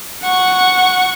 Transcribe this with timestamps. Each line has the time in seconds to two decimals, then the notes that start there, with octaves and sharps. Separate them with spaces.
0.22 F#5 C#6